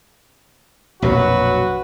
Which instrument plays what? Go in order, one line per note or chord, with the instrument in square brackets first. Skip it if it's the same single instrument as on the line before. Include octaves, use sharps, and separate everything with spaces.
[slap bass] A#1 F2 B2 [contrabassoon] F#3 [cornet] F#4 [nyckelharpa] B4